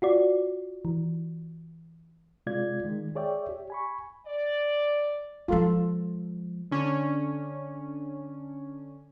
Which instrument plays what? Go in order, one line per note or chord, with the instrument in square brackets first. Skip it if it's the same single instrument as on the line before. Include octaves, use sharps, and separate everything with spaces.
[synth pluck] F4 F#4 D5
E3
[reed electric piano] C3 G#3 F4 D5 G#6
D#3 G#3
G#4 C#5 D5 E5 G5
G4
G#5 B5 C#6
[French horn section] D5
[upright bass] F3 G#3 [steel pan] F4 A4
[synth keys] D3 C#4 D4